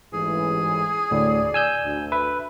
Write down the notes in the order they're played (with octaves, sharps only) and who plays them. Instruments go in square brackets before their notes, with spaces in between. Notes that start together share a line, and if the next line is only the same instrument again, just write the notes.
[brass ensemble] A1 G#2 E3 [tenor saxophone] G#4
[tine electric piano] D2 A2 [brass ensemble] D5
[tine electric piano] G#5 E6 G6
[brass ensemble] D2
[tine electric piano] B4 E5